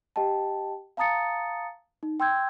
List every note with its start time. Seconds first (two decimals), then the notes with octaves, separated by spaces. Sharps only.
0.16 G4 D#5 G5 A5
0.97 F5 A5 A#5 D#6 A6 C#7
2.03 D#4
2.20 G5 C6 E6 G6 G#6